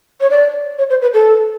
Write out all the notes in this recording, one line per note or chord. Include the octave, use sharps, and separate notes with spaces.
C#5
D5
C#5
C5
B4
A4